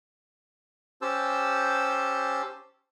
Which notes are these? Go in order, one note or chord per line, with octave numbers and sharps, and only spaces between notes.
C#4 G4 C5 A5 E6